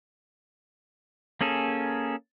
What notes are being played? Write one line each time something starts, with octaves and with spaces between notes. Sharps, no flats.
A#3 C#4 G#4 A4